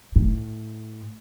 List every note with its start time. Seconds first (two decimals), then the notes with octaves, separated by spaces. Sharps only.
0.16 A2